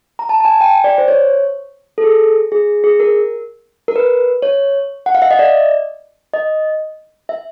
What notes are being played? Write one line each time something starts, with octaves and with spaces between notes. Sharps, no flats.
A#5
A5
A5
G#5
G5
D5
C5
C#5
A4
G#4
G#4
G#4
A#4
A#4
B4
C#5
F#5
F5
E5
D#5
D5
D#5
E5